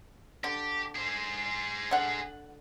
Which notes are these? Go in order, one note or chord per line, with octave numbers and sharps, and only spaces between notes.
D3 G4
G#4 C5
D3 F#5